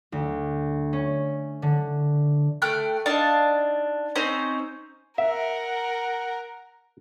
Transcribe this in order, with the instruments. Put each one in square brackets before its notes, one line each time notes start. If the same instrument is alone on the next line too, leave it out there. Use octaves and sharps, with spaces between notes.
[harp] D2
C#4
D3
[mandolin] A3 G5 F6 F#6
D4 D#4 F5 A5
C4 C#4 D#4 C5
[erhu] A#4 [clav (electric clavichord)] E5 [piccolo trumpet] F#5